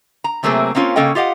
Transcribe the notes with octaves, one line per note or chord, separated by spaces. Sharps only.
A#5
C3 F#3 A3 A#3 C4 G#4
A#3 C4 C#4 F4 C#5
C#3 A#3 C#4 A4 D#5 G5
F4 G4 D#5 F5 F#5